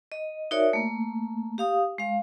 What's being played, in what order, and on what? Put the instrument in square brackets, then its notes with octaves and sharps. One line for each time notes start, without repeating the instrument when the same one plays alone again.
[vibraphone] D#5
D#4 F#4 A#4 C#5 D5 E5
A3 A#3
G4 F5 D#6
G#3 F5